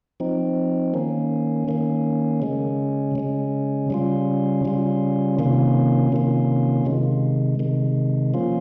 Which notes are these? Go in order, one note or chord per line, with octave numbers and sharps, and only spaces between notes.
F3 C4 D#4
D#3 A#3 C#4
D#3 A#3 C#4
C#3 G#3 C#4
C#3 G#3 C#4
C#3 G3 C#4 F4
C#3 G3 C#4 F4
C3 D#3 A#3 C#4 F4
C3 D#3 A#3 C#4 F4
C3 D#3 G#3
C3 D#3 G#3
F3 A#3 C#4 F4